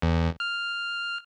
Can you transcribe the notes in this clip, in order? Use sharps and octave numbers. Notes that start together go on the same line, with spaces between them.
E2
F6